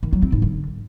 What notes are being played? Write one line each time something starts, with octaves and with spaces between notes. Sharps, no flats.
D#3
F#3
C4
G#2
D3